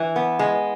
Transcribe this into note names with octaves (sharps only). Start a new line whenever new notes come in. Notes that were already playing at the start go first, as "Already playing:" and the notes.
Already playing: E3
B3
G#3